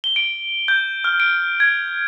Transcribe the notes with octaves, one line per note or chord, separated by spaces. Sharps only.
G7
D7
G6
F6
D7
G#6